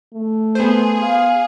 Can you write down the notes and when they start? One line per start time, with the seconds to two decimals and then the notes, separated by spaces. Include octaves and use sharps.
0.13 A3
0.55 B3 G#4 C5
1.02 F5